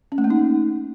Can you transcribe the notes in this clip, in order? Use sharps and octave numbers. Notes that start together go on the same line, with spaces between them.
C#4
A3
A#3
D#4